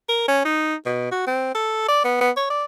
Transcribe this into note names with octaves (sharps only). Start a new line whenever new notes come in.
A#4
C#4
D#4
B2
F#4
C4
A4
D5
B3
B3
C#5
D5